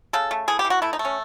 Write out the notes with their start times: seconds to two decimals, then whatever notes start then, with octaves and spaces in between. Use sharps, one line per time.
0.13 C#3 A4
0.31 A3
0.48 E3 G#4
0.59 G4
0.65 E3
0.70 F#4
0.82 A3 E4
0.93 D#4
0.99 A3
1.05 C#4